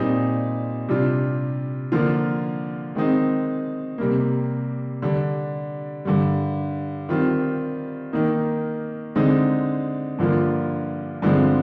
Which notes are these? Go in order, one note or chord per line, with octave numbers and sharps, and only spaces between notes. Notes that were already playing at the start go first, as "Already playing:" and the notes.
Already playing: A#2 G3 C4 D#4
C3 G3 D4 F4
D3 F3 A#3 F4
D#3 G#3 C4 D#4
C3 G3 A#3
D3 G3 D4
G2 D3 G3
D#3 G3 C4 F4
D#3 A#3 D#4
D3 G#3 C4 D#4
G2 D3 F3 A#3 F4
G2 D3 F3 G#3 C4